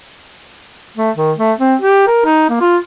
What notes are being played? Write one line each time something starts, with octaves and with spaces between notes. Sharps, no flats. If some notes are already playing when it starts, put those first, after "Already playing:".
A3
D#3
A3
C4
G4
A#4
D#4
A#3
F4